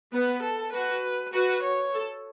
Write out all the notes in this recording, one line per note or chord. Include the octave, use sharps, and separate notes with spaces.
B3 B4
A4
F#4 B4
F#4 B4
C#5
A4